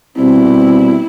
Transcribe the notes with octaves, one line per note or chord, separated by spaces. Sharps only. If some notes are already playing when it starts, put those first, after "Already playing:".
B2 G3 C4 E4